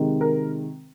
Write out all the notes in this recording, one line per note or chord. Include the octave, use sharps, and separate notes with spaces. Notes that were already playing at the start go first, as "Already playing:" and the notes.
Already playing: C3 D#3 G#3
A#4